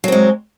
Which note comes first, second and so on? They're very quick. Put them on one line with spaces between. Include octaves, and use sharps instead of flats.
F#3 C4 G#3